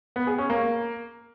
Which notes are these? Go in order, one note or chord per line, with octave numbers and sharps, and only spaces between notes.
B3
G#4
C#4
A#3